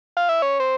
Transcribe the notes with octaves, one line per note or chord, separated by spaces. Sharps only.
F4
E4
C#4
C4